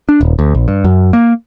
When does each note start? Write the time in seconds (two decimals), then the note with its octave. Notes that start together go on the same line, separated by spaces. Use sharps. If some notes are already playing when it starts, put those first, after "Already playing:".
0.09 D4
0.21 D#1
0.39 D2
0.55 A#1
0.68 G2
0.84 F#2
1.13 A#3